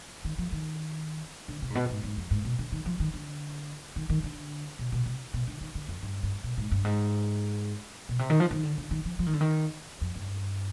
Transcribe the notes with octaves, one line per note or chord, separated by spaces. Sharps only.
D#3
F3
D#3
D3
C3
G#2
B2
G#2
G#2
F2
G#2
B2
D3
D#3
F3
D#3
D3
D#3
D#3
D3
B2
B2
C3
B2
D3
D#3
D3
F2
G2
G2
B2
G#2
G2
G#2
B2
C3
D#3
F3
D#3
D3
D3
D#3
F3
F3
D#3
D3
D#3
F2
G2